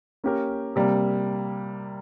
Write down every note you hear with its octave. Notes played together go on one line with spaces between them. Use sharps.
A#3 C#4 G4 A#4
C3 G3 A#3